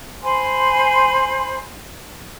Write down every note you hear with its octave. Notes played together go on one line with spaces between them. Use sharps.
C5 G#5 B5 C6